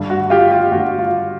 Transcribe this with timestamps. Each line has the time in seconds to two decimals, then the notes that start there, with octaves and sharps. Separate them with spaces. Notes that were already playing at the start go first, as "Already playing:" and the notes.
Already playing: G2 D3 G3
0.10 F#4
0.30 F4 G4
0.51 F4 G4
0.72 G2 D3 G3 F#4
0.99 F4